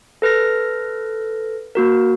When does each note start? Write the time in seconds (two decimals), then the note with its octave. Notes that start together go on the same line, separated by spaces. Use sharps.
0.22 A4 B4 F6 A#6
1.75 A#3 F#4 A#4